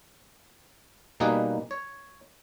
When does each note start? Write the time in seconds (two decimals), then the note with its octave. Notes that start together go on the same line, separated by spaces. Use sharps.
1.20 B2 G3 A#3 D#4 G#4 B4
1.71 C#5